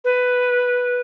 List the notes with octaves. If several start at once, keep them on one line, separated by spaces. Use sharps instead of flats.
B4